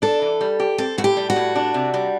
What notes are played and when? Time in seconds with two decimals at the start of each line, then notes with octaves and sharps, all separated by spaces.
0.02 D4 A4
0.22 E3
0.41 G3
0.60 G4
0.78 C4 A4
0.98 A2 F#4
1.04 G4
1.17 G3
1.30 F#4
1.36 A2
1.55 D4
1.74 C3
1.94 G3